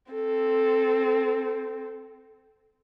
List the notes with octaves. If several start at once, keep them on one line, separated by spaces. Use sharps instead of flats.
C4 A4